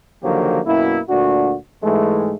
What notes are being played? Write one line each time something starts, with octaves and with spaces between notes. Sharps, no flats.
D3 D#3 F3 F#3 A#3 G4
F#2 B2 A#3 E4
D2 A#2 D4 F#4
G#2 E3 G#3 A3